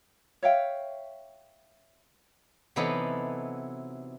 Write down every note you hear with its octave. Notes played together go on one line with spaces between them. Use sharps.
C#5 E5 F5 G5
C3 E3 F#3 B3 D#4 A4